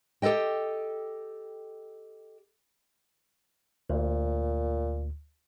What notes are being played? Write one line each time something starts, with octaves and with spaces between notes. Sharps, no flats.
G4 A4 B4 D#5 G5
D2 A#2